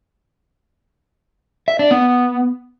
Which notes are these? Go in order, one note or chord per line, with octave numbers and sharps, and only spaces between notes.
E5
D4
B3